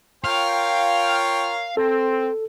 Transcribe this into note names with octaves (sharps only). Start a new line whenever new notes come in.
F4 A#4 C#5 F5 G5
C4 A4